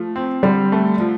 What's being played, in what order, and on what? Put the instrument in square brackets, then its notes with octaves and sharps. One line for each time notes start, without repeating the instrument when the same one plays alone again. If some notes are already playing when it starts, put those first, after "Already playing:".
Already playing: [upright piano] F3 A3
C4
[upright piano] D3 [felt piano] G3
[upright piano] A3
F3